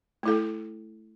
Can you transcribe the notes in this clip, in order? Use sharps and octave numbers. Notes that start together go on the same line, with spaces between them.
A3 E4 A4